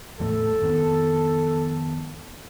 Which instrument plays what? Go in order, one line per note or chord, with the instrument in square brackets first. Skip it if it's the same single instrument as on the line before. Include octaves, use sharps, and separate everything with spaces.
[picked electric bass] E2 A2 A3 [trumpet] A4
[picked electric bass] F2 D#3 B3